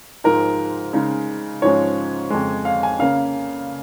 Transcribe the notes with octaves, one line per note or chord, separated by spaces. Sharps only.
G#2 F3 G#3 D#4 A#4
C#3 G#3 D#4
G#2 F3 G#3 C#4 C#5
F2 C#3 G#3
F5
G#5
C#3 A#3 C#4 F5